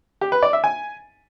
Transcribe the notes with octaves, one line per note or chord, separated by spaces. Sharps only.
G4
B4
D5
E5
G#5